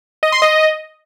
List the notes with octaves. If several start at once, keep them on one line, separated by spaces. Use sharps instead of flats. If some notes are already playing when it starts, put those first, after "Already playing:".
D#5
C6
D#5